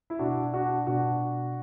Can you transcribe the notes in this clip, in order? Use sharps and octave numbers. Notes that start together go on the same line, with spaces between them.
E4
B2 D4 F#4
D4 F#4
B2 D4 F#4